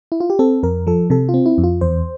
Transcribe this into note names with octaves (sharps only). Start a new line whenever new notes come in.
E4
F4
G4
C4 A4
F2 A#4
F3 A4
C3 A4
F4
C4
E4
F2
F4
E2 C5